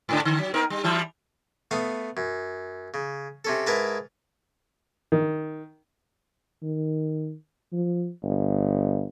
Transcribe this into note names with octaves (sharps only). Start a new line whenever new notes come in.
G#2 D3 D4
D3
F#3
B3 D#4 A#4
G3
E3 G3 E4
A3 B3 F5 D#6
F#2
C#3
C3 C#4 A4
G#2 E4 A#4 B4 A5 B5
D#3
D#3
F3
G1